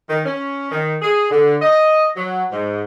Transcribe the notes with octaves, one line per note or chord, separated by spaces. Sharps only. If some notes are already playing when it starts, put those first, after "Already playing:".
D#3
C#4
D#3
G#4
D3
D#5
F#3
G#2